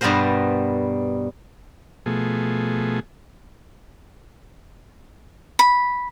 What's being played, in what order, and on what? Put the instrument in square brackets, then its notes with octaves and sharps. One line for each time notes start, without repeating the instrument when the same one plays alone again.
[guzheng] G2 B2 G3 B3 A#4 C5
[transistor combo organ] B2 F3 A3 G#4
[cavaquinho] B5